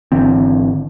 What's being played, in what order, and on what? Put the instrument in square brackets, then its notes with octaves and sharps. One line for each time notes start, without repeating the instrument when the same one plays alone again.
[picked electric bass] G#1 D3 E3 C4